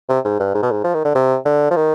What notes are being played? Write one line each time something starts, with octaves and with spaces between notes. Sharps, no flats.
C3
G#2
G2
G#2
B2
G#2
F3
D#3
D3
C3
D3
F3
D#3